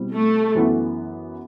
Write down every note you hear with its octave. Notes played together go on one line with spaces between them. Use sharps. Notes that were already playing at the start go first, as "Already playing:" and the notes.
Already playing: B2 G3 C4 E4
A3
F#2 E3 B3 E4